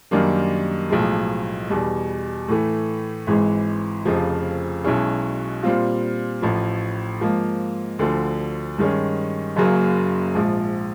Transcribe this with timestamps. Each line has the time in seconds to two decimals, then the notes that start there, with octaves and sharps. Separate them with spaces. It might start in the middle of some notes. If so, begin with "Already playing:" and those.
0.11 F#2 D#3 G3 A#3 D4
0.90 B1 A2 F3 G#3
1.69 E2 B2 G3
2.48 A2 E3 A3
3.27 G#1 G#2 E3 G#3
4.05 F1 F2 C#3 F3
4.84 B1 B2 G#3 C#4 E4
5.63 A#2 G3 C4 F4
6.42 A1 A2 F3
7.21 G#2 F3 A#3
7.99 D2 D3 F3
8.78 G2 D#3 G#3 C#4
9.56 F#1 F#2 C#3 F#3 A#3
10.35 A#1 G#2 F3